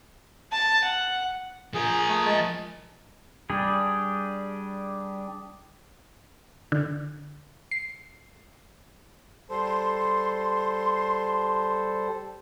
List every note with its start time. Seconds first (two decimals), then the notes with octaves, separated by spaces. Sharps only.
0.52 A5
0.84 F#5
1.74 F3 G#4 A#4
2.09 A3
2.26 G#3 A5
3.50 G3 D4 G#4
6.72 D3
7.71 C7
9.50 G3 A4 C5 C6